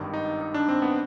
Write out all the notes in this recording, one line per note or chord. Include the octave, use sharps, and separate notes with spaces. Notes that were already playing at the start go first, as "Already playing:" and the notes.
Already playing: G#1 G2 D#3
D#4
D#4
D4
C4
B3